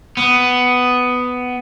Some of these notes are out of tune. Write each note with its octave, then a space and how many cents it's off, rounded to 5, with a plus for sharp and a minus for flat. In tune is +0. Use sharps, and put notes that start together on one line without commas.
B3 +10